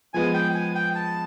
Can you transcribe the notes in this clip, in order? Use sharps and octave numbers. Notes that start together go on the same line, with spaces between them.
F3 G#3 B3 G#5
G5
G#5
G5
A5